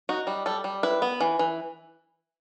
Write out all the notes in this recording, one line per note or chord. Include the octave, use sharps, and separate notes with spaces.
D#4 F#4
G3
G3 A4
G3
E4 B4
B3
E3
E3